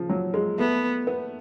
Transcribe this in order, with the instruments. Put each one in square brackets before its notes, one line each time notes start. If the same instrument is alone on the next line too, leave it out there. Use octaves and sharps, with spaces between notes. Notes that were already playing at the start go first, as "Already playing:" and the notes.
Already playing: [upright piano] C#3 F3
F#3
G#3
[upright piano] A3 [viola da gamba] B3
[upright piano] B3